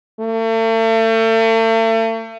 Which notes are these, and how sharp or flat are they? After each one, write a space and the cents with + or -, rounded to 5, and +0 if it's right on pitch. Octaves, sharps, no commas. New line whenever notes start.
A3 +40